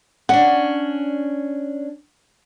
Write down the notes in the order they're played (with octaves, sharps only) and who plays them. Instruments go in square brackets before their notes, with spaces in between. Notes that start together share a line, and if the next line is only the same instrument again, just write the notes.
[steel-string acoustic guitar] C#4 D4 [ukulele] F#5